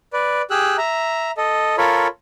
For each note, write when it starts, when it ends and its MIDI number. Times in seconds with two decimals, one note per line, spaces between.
0.13 0.42 71
0.13 0.42 74
0.51 0.77 67
0.51 0.77 68
0.51 0.77 88
0.51 0.77 90
0.78 1.31 76
0.78 1.31 82
1.37 1.76 69
1.37 1.76 75
1.78 2.07 65
1.78 2.07 69
1.78 2.07 70
1.78 2.07 73
1.78 2.07 83